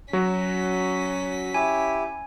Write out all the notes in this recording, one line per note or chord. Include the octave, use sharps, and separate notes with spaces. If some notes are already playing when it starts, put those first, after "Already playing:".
F#3 C#4 F#4 B6
E4 G4 G#5